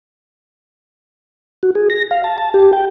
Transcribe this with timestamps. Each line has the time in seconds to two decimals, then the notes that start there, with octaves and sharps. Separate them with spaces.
1.63 F#4
1.75 G#4
1.90 A#6
2.11 F5
2.24 A5
2.38 A5
2.54 G4
2.73 G5